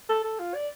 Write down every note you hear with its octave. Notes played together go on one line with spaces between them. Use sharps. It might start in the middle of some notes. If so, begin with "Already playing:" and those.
A4
A4
F4
D5